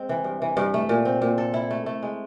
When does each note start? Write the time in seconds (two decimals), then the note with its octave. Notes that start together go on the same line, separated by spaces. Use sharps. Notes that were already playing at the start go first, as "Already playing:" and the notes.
Already playing: G#3 C4
0.09 E3
0.24 G2
0.42 E3
0.57 G2
0.74 A3
0.89 A#2
1.05 C4
1.22 A#2
1.38 A4
1.54 E4
1.71 A3
1.86 A3
2.03 G#3